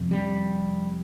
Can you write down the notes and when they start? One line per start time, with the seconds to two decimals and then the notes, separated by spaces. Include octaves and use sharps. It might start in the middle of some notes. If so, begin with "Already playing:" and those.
Already playing: F2 C3
0.11 G3